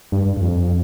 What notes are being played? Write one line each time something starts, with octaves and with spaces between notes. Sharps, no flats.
G2
G2
F2